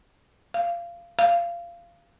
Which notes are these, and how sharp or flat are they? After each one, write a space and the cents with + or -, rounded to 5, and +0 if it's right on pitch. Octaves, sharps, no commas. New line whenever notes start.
F5 -20
F5 -20